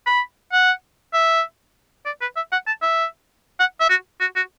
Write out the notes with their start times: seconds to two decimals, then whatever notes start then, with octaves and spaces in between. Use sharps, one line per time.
0.06 B5
0.53 F#5
1.13 E5
2.06 D5
2.21 B4
2.36 E5
2.52 F#5
2.67 A5
2.82 E5
3.60 F#5
3.80 E5
3.90 F#4
4.21 F#4
4.36 F#4